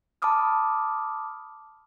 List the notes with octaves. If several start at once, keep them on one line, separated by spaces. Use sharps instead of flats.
A5 B5 D6 D#6 F6